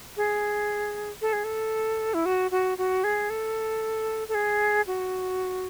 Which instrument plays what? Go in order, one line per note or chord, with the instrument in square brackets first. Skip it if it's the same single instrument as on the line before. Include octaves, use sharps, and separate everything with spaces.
[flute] G#4
A4
G#4
A4
E4
F#4
F#4
F#4
G#4
A4
A4
G#4
F#4